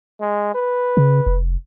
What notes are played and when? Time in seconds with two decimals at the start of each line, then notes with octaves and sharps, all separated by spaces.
0.21 G#3
0.55 B4
0.97 C#3
1.26 F1